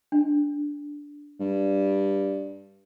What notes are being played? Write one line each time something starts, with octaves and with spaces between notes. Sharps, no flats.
D4
G2